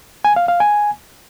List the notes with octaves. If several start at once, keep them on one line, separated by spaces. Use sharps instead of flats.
G#5
F5
F5
G#5